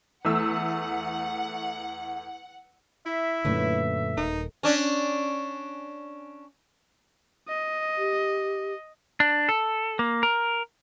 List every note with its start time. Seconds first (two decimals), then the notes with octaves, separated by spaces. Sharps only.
0.25 E2 A3 F#5 E6
3.06 E4 E5
3.45 F#2 A#2 D3 A3 C#4 B4
4.18 D#1 D#4 A#4
4.63 C#4 D4
7.48 D#5
7.98 G4
9.20 D4
9.49 A4
9.99 A#3
10.23 A#4